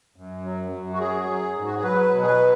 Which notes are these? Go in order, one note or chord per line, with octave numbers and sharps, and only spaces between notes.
F#2
F#3
F#2
F#4
F#3 G#4
F#3
G#2
F#4
G#4
F#3 B4
B2
G#4
B4
F#3